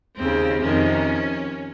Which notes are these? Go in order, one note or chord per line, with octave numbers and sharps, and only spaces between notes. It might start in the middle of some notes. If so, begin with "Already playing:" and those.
D#2 C#3 C4
F2 C3 D#3 C#4